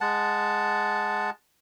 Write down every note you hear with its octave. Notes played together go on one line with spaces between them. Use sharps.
G#3 F#5 A5